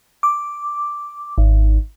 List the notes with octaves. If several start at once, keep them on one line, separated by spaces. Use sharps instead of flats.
D6
G#1